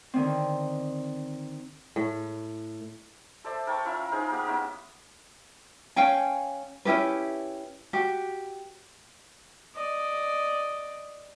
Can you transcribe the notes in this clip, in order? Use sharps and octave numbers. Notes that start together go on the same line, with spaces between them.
D3 D#3 C4
A2
A4 C5 D5 E5
A#4 G5 A5 C#6
C#4 E4 F4 A#4
D#4 G#4 A#4 C5
B3 G4 A#4
B3 C#4 E4
C#4 F5 G5 G#5
C#4 E4 G4 B4
F#4 G4
D5 D#5